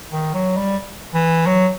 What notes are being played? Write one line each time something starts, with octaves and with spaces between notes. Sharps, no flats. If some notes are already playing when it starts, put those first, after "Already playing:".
D#3
F#3
G3
E3
F#3